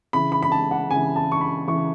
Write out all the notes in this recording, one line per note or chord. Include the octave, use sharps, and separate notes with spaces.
C#3 E3 B5
B5
B5
A5
F#5
C#3 E3 G#5
A5
C#6
B5
C#3 E3 C#6